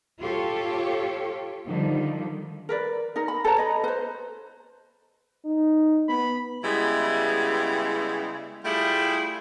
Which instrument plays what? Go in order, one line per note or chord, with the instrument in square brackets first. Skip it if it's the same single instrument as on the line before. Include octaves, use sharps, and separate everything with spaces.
[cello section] F4 G4 A4 C#5
D3 D#3 F3 G3
[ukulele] A#4 B4 D5
D#4 A#4
B5
A4 B4 C#5 A#5
D#5 B5
B4 C5
[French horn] D#4
[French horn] B3 [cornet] B5
[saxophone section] C#3 G3 G#3 B3 E4
G3 A3 E4 F4 G4 G#4